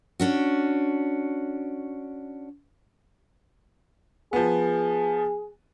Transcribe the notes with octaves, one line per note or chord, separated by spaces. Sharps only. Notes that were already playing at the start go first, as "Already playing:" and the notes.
C#4 D4 F#4
F3 B3 G#4